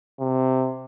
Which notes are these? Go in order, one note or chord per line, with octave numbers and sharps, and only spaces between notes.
C3